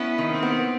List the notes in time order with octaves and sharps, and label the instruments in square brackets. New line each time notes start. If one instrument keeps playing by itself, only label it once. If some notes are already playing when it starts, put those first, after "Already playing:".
Already playing: [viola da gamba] B3 C#4 [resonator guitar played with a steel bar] E4
[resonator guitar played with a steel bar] D#3
[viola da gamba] A#3 C4
[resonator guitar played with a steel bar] B3